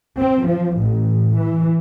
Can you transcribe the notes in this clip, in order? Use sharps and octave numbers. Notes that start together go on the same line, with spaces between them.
C4
F3
A1
E3